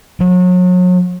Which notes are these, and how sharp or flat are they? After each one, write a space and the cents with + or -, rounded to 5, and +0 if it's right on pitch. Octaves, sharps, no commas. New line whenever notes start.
F#3 -35